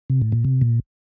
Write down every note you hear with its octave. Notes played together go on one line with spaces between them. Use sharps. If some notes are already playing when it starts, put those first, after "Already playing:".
C3
A2
A#2
C3
A#2